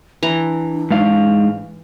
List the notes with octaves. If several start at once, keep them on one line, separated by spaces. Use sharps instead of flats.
E3 D4 A#5
G#2 F5